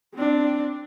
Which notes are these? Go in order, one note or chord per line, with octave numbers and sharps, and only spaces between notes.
C4 D4